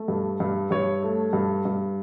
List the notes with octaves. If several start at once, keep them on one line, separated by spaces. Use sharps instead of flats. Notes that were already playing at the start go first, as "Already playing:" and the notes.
Already playing: A3
G2
G2
G2 C#5
A3
G2
G2